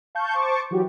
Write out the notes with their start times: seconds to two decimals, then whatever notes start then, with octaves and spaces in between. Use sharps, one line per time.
0.15 F5 A5 C#6 G6
0.35 C5 A5 C#6 D6
0.71 E3 F#3 F#4 G4